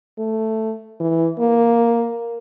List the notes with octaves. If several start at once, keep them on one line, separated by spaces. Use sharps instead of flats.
A3
E3
A#3